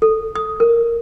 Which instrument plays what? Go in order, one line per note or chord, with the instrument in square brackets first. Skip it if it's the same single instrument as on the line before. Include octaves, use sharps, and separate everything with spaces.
[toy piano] A4
D#6
A#4